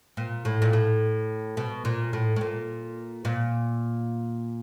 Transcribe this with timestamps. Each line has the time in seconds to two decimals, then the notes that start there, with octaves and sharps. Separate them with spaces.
0.17 A#2
0.45 A2
0.62 A#2
0.73 A2
1.57 B2
1.85 A#2
2.13 A2
2.36 A2
2.41 A#2
3.25 A#2